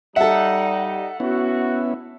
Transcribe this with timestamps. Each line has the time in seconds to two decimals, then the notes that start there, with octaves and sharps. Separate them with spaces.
0.16 G3 D#4 A4 E5 F#5
1.20 B3 C#4 E4 F#4